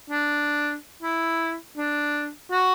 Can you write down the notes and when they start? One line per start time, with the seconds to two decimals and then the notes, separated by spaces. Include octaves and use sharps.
0.10 D4
1.03 E4
1.77 D4
2.51 F#4